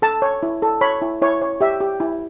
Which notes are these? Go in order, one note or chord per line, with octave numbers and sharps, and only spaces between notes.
A4 A5
C#5
E4
A4
C#5 B5
E4
E4 C#5
C#5
G4 E5
G4
E4